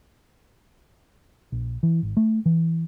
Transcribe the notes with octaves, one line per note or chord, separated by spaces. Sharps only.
A#1
E3
G#1
A3
E3